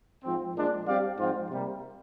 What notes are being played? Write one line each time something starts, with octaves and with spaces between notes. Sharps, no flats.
G#2 F3 C4
A#2 F3 G#3 D4
G3 C4 G4 D5 F5
G#2 F3 C4 F4
C3 G3 A#3